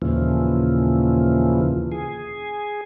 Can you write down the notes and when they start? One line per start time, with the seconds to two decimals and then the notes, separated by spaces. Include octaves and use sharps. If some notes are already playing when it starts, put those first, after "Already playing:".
0.02 D#2 A#2 C#3 E3 F3
1.92 G#4